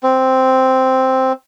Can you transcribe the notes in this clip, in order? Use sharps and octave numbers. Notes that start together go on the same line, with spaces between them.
C4